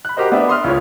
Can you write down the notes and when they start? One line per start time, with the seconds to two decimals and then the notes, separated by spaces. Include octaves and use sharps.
0.05 B5 F#6
0.17 F#4 G4 A#4 C5 D#5
0.32 B3 D4 E5
0.48 B5 C6 D#6 F6
0.64 C#2 F4 C#5